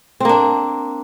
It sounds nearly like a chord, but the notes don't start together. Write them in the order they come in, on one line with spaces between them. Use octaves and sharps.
C4 A#3 D4